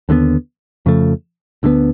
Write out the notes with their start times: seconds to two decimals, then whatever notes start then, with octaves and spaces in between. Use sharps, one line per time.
0.09 D#2 D3 F#3 B3
0.86 F2 C#3 F3 A3
1.63 D2 D3 F#3 B3